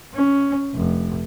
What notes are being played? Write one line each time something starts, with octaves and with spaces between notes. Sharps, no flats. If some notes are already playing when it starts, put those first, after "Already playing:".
C#4
F1